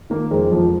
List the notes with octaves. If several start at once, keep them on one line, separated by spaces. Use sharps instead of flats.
D#3 A#3
F2 G#3
F2 F3